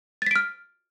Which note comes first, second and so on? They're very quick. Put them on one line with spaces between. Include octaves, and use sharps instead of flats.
A6 B6 D7 F6